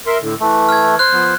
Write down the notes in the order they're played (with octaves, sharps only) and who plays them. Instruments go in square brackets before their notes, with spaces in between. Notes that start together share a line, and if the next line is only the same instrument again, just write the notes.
[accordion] A#4 E5 C6
A2 D3
[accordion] E3 [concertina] A3
[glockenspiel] F6 G#6
[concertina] C5 [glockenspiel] F#6
[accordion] F3 B3